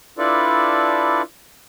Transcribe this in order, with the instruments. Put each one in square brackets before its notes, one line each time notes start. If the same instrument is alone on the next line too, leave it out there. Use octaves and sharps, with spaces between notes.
[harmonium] D4 E4 F4 A4 B4 D5